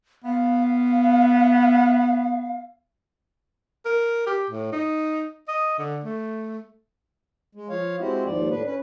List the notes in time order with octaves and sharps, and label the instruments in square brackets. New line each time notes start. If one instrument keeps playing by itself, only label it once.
[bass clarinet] B3 [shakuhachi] F5
[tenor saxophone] A#4
G4
A2
D#4
D#5
D3
A3
[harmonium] G#3
F3 C#5 F5
G#3 C4 E4 F#4 G4
D#2 G#2 F3 D5
A2 D4 B4
C#4 B4